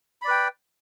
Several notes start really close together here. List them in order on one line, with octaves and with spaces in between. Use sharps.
B5 D5 B4 G5